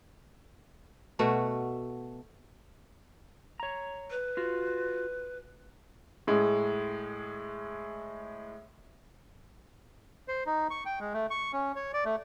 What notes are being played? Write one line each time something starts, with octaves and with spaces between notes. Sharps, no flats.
B2 A3 F#4
C#5 A#5
B4
F4 F#4
A2 G#3
C5
D#4
C#6
G5
G#3
A3
C#6
C#4
C#5
D5
A3